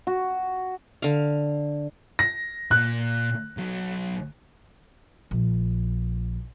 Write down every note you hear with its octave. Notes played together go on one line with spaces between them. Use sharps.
F#4
D3 F5
A#6
A#2 F#6
B1 F#3
A#1